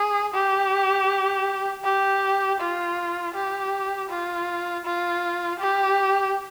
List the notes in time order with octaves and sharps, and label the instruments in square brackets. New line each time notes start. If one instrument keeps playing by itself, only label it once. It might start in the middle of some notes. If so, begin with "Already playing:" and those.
Already playing: [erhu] G#4
G4
G4
F4
G4
F4
F4
G4